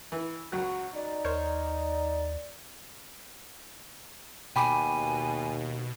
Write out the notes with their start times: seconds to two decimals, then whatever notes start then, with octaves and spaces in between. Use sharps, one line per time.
0.12 E3 E4
0.52 C#2 F#3 F#4 F#6
0.94 D#4 D5
1.25 D#2 A#4 C5 C#5
4.56 D#2 B2 G5 G#5 B5 D6